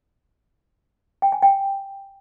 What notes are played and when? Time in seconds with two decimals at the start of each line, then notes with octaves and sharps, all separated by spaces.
1.22 G5
1.32 G#5
1.42 G5